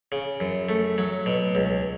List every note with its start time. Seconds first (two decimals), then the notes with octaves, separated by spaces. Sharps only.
0.12 C#3
0.40 F#2
0.69 A3
0.98 F#3
1.26 B2
1.55 C#2